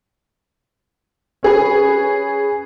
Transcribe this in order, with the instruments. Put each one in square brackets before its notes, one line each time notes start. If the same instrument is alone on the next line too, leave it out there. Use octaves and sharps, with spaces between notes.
[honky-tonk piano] C#4 G#4 B4